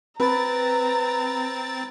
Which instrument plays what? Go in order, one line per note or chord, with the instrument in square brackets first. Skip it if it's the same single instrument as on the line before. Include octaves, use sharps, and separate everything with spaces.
[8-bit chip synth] C4 A6 [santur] B4 [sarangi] A#5